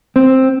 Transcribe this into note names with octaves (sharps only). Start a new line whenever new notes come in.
C4